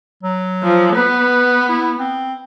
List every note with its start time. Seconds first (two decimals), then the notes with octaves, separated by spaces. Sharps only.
0.23 F#3
0.63 F3
0.96 B3 B4
1.69 E4
1.99 C4